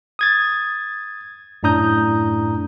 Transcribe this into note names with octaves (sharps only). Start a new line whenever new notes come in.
D#6 G#6 A6
F#2 A2 D4 A#5 D#6 G6